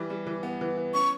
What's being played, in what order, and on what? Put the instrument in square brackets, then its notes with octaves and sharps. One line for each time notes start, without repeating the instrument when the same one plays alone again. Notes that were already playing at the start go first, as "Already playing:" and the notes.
Already playing: [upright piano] E3 G3
G3
E3
B3
E3
B3
[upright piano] C#4 [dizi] C#6